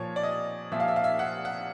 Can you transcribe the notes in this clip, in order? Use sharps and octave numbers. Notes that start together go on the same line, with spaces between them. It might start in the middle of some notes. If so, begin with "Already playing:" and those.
Already playing: A#2 F3 C#5
D5
D#5
A#2 F3 E5
F5
E5
F5
E5
F#5
F#5